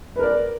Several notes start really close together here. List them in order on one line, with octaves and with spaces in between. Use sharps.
B4 A#4 D5